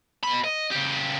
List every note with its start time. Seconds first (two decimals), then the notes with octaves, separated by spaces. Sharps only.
0.24 B2 B5
0.44 D#5
0.71 C#3 G4